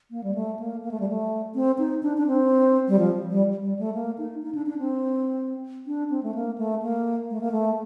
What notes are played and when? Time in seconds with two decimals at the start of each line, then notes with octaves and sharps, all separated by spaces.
0.11 A#3
0.24 G3
0.35 A3
0.59 A#3
0.83 A#3
0.91 A3
1.00 G3
1.09 A3
1.55 C4
1.79 D#4
2.03 D4
2.17 D4
2.27 C4
2.88 G3
2.99 F3
3.31 G3
3.62 G3
3.79 A3
3.94 A#3
4.18 D#4
4.42 D#4
4.55 D4
4.66 D4
4.78 C4
5.87 D4
6.10 C4
6.23 A3
6.34 A#3
6.58 A3
6.82 A#3
7.31 A3
7.41 A#3
7.52 A3